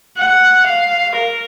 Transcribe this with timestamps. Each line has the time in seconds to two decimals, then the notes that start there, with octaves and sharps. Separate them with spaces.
0.18 F#5
0.66 F5
1.15 A#4